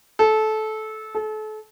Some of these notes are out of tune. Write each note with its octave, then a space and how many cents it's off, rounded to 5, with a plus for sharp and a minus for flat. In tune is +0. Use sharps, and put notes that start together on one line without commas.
A4 -20
A4 -35